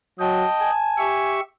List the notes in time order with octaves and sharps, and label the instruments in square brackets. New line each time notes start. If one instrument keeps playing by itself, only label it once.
[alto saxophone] F#3 [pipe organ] D#5 G5 [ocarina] A5
[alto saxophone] G#5
[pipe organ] G4 E5 C#6